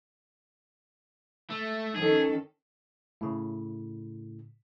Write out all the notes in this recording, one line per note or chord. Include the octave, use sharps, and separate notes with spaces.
A3
D#3 C#4 G#4 A4
A2 C#3